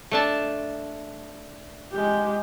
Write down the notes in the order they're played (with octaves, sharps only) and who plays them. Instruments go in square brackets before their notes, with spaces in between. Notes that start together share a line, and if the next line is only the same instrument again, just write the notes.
[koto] A3 D4 A5
[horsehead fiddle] G#3 G4